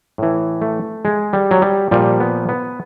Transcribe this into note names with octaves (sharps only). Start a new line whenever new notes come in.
A2 E3
A3
G#3
G3
F#3
G3
A#2 F3 G3
B3
B3